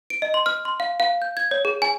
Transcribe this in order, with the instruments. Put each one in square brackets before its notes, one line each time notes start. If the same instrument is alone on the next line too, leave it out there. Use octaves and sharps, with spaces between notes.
[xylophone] D7
D#5
C6
F6
C6
F5
F5
G6
G#6
C#5
G#4
G#5